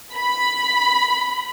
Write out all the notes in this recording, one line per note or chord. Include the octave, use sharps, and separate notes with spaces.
B5